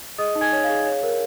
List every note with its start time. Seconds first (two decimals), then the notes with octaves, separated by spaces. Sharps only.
0.18 G#4 D#5 D#6
0.35 D#4
0.41 G#5 G#6
0.52 C#5
0.64 F5
0.69 G#4
0.86 C#5
1.03 A#4